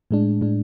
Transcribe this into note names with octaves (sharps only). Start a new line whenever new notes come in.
A2 G#3 D4
A2 G#3 D4